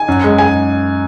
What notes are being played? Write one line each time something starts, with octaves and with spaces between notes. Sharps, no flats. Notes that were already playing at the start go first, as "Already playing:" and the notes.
Already playing: G#5
F#2
G#3
G#3 G#5